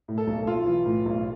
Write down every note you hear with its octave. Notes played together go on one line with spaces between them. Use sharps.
A2
A4
B1
B1 F4
E3
A2
B1